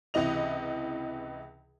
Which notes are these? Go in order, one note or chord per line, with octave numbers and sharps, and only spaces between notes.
C#2 C3 E3 D#5 F7